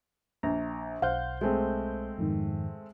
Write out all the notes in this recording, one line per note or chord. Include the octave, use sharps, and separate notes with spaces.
A#1 A#5
B1 C5 F5 F#5 G6
G#3 A3 C4
F2 G#2 D#3